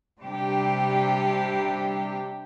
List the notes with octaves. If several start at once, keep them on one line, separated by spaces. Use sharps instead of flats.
C3 G3 D4 G4